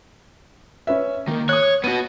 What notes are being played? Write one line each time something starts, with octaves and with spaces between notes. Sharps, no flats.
C#4 B4 E5
D#3 A#3
C#5 D#6 F#6
B3 F#4 D#7